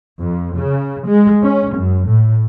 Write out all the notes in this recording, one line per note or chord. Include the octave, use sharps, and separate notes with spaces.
F2
C#3
G#3
C#4
F#2
A2